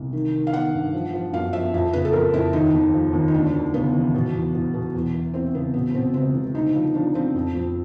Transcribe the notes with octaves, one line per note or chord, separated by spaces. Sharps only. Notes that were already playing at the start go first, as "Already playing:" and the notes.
Already playing: C2
D#3
D#3
F5
D#3 F#5
G2
F3
F3
F#2 F5
F3 E5
F2 E5
C#3 B4
A4
F2 A#4
F2 E4
D#2 D#4
D#2
F3
D#2
D#4
D2 D4
D2
C#3 B3
E3
B2
E2
E2
B2
E2
E3
E3 C4
C#3 B3
B2 B3
B2 C4
C#2 C4
C#2
D2 D#4
F3
F3 D4
F3 C4
F2
F2